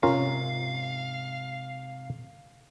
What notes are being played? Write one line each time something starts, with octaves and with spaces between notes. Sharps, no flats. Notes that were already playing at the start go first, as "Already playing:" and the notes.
G#2 C3 C#4 F4 A#4 F5